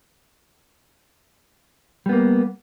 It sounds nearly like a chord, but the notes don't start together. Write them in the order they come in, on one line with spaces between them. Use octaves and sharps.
G3 B3 A#3